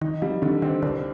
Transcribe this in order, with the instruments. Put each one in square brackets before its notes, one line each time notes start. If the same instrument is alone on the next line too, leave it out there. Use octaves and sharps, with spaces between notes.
[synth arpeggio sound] D#3 [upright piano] D#4
[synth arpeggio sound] F3 [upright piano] G3
[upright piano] D3 [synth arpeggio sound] D#3
[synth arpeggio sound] D#3 [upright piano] C4
[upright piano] C2 [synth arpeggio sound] D3